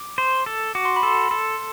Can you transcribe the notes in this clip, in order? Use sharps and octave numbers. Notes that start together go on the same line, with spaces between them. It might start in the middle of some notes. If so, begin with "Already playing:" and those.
Already playing: D6
C5
A4
F#4 D6
C6
B5
A4 C6
A4